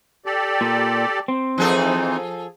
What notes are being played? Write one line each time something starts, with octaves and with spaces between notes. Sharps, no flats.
G4 A4 D5
A#2
C4
E3 F3 D#4 G#4 A4